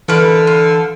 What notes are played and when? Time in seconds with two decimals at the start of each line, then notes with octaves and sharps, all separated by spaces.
0.08 D3 E3 A#4 B4 F5 B5
0.47 F4